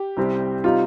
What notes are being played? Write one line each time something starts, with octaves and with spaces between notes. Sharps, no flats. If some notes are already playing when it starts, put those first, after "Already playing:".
Already playing: G4
C2 C3 G3 C4
C3 G3 C4 D#4 F4